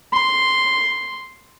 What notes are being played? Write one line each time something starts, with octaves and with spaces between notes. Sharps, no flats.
C6